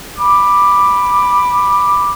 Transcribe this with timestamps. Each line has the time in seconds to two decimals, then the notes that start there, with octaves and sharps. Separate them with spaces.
0.19 B5 D6